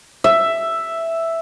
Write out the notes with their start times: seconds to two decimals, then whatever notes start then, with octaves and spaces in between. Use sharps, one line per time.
0.24 E5